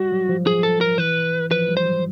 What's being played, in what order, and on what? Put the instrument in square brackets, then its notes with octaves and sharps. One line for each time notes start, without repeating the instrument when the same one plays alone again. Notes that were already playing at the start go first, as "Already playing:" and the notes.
Already playing: [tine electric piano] G3 [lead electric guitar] F#4
[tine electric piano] F#3
F3
[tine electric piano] F3 [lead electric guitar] G#4
[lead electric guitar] A4
A#4
[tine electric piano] E3 [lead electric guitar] B4
[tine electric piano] F3 [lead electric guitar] B4
[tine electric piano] G3
[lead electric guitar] C5
[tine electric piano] F#3